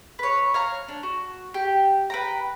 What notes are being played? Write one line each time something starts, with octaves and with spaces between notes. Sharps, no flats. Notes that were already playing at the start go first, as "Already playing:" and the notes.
B4 C#5
C#5 F5 A#5
D4
F#4
G4 G5
B4 G5 A#5